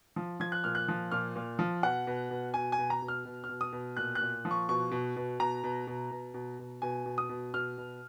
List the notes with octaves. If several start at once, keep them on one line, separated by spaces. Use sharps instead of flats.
F3
F3 G#6
F#6
A#2 F6
F#6
F3
A#2 F6
A#2
F3
B2 F#5
B2
B2
B2 G#5
G#5
B2
A#5
B2
F6
B2
F6
B2
D#6
B2
A#2 F#6
F#6
A#2
F3
C#6
B2 C#6
B2
B2
B2 A#5
B2
B2
B2
B2
B2
B2 G#5
B2
D#6
B2
B2 F6
B2